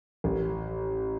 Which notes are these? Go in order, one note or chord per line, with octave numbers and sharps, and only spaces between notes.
A1